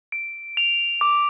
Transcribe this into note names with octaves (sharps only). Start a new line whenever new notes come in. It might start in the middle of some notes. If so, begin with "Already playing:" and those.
D7
F7
D6